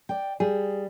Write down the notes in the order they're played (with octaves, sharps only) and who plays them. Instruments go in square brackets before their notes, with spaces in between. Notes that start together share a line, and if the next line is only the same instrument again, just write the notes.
[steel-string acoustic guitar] D5 G5
[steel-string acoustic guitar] G3 [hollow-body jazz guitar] G#4